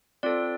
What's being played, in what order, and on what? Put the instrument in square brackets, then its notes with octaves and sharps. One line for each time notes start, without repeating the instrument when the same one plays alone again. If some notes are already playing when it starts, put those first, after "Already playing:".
[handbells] C4 F4 A4 D5